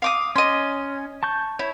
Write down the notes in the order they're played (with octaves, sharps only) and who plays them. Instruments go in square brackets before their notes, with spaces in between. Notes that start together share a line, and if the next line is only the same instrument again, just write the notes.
[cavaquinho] F5 D6 D#6
[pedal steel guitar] C#4 [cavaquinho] D#5 C6
[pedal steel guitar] A5 C#6 G6
[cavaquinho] E4 [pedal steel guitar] C#5